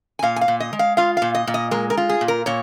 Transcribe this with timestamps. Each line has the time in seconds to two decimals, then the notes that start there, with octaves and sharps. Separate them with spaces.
0.19 G#5
0.23 A#2 F5
0.36 G#5
0.41 F5
0.48 A#2
0.60 D#5
0.73 G#3
0.79 F5
0.97 F4 F5
1.17 F5
1.22 A#2
1.35 D#5
1.47 A#2
1.54 D#5
1.71 G#3 A#4
1.90 A#4
1.97 F4
2.09 G#4
2.21 A#2
2.28 A#4
2.46 A#2 C#5